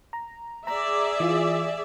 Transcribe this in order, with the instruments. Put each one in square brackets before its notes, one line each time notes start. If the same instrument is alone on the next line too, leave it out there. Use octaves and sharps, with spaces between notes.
[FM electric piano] A#5
[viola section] G#4 D5 E5 [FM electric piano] A#5
[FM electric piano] E3 F4